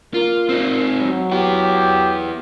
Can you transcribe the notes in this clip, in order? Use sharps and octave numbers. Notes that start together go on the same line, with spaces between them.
A#3 F4
A#2 C4 D#4
F#3
B3 E4 G4